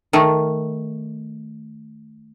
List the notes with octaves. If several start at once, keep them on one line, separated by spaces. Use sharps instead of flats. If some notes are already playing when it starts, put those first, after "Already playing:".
D#3 A3